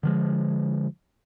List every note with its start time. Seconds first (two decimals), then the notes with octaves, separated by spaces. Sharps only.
0.03 D3 F3 G#3